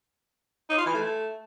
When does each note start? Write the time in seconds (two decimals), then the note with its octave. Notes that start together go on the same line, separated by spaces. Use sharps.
0.70 D#4
0.78 F4
0.86 E3
0.94 A3